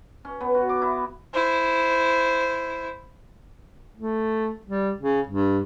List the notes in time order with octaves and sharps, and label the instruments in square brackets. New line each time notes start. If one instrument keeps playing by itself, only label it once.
[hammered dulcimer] C#4
B3
F#4
D6
E4
[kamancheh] E4 C5
[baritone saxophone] A3
G3
C#3
G2